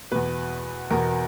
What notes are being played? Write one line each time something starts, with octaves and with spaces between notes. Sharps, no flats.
E2 B2 B4
E2 B2 A#4